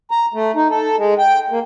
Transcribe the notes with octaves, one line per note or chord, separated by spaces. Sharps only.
A#5
A3
D#4
A4
G#3
G5
A#3